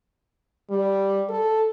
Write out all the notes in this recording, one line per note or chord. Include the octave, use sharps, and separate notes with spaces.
G3
A4